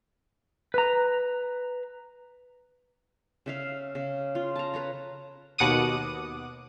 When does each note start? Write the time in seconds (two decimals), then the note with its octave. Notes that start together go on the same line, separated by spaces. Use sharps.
0.74 B4 A#5
3.46 C#3 E5 F5
3.95 C#3
4.35 F4
4.56 A5 A#5
4.74 B4 C#5 A#5
5.58 D#2 B2 F#5 D6 D#6 D#7